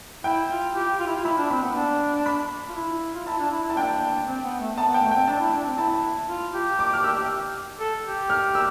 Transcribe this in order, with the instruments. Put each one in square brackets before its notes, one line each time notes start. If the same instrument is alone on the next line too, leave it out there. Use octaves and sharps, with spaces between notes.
[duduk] E4 [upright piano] G5
[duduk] F4
G4
F4
E4
F4
[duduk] E4 [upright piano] B5
[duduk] D4
[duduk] C4 [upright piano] B5
[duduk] B3
D4
[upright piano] B5
[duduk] F4
E4
F4
[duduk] E4 [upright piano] A5
[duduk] D4
E4
E4
[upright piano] A5
[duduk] D4 [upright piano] G5
[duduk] C4
B3
A3
[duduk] B3 [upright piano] A5
[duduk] B3
[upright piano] G5
[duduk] A3
[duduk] C4 [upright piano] G5
[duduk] D4 [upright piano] A5
[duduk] E4
D4
C4
[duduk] E4 [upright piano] A5
[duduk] F4
G4
[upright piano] D6
F6
E6
[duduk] A4
G4
[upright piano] F6
E6